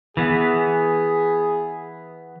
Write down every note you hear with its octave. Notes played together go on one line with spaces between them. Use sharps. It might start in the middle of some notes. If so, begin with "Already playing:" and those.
E3 B3 G#4